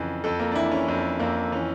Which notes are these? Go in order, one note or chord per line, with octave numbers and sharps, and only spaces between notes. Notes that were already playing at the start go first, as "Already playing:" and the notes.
Already playing: F2 C#3 E3
F2 A4
A#3
D4
E3 E4
C#4
F2
F2 A#3
E3 C#4